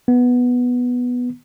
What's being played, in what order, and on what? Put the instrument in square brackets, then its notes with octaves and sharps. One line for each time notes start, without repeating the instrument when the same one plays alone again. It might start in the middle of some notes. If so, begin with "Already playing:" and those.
[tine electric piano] B3